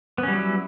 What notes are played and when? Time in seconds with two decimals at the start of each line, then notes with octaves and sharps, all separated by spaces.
0.18 B3
0.23 C#4
0.28 G3
0.33 F#3
0.38 E4